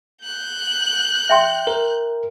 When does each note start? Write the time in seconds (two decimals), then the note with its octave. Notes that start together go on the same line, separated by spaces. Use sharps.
0.24 F#6 G6
1.29 E5 G5 C6
1.67 A#4